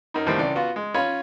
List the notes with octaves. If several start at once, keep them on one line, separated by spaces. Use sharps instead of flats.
F#2 D#4
D#2 A2 G3 C4
C#2 E3 D5
B3 F4 F#4
G#3
C#4 F4 C#5 B5